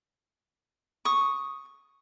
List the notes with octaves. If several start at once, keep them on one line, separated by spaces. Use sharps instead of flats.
C#6 D#6